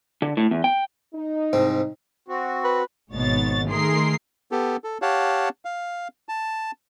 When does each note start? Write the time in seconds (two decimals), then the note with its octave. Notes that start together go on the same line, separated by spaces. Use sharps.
0.22 D3
0.37 A2
0.51 E2
0.64 G5
1.14 D#4
1.53 C2 G#2 C4
2.28 C4 F#4
2.64 B4
3.12 G#1 G#2 B2 C#5 A6
3.68 D#3 A3 G#4 A#4 C6 C7
4.51 B3 G4 A4
4.84 A4
5.02 G4 C#5 F5 F#5 A5
5.65 F5
6.29 A5